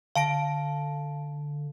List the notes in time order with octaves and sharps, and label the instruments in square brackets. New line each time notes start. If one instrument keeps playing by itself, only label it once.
[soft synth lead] D3 [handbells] F5 A5 D7